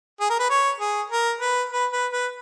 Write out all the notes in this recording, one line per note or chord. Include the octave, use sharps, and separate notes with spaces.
G#4
A#4
B4
C#5
G#4
A#4
B4
B4
B4
B4